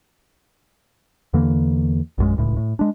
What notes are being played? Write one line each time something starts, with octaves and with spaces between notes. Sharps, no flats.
E2 D3 E3 A#3
A#1 F#2 G#3
D1 C#2 A2
A2
G#3 D4